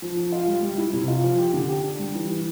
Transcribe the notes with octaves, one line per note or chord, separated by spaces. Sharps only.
F3
F3
F4
G3
G3
E4
C3
F4
F3
G4
D3
G4
D4
G3
E3
E3